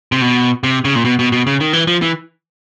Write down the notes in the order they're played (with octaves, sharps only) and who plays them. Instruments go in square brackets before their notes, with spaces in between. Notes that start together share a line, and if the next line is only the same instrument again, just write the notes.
[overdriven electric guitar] C3
B2
C3
C#3
A#2
B2
B2
B2
C#3
D#3
E3
F3
E3